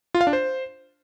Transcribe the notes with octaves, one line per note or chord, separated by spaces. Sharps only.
F4
F5
D4
C5